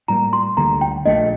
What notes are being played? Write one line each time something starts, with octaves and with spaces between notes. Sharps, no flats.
A2 G3 A#3 A#5
C6
D2 D3 G3 A#3 A#5
G5
A#1 A#2 A3 D4 D#5